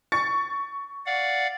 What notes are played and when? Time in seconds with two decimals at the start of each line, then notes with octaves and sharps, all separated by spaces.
0.12 C#6 A6 C#7
1.06 D5 F5 F#5